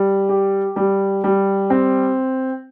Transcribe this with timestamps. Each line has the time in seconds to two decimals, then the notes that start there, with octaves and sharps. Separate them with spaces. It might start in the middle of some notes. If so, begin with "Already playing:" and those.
Already playing: G3
0.29 G4
0.76 G3
1.24 G3
1.70 C4